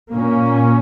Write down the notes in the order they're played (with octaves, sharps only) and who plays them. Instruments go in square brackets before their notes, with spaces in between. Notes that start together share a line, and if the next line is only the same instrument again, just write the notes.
[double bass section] A#2 A#3 C#4